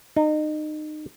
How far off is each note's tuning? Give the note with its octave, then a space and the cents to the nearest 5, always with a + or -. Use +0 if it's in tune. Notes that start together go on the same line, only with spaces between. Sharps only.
D#4 -25